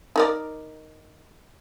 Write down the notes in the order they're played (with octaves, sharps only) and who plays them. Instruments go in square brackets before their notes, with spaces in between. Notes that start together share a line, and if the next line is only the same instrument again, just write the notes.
[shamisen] D#4 A#4 D5